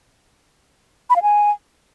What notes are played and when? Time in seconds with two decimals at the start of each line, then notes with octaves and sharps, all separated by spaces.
1.10 B5
1.16 F5
1.22 G#5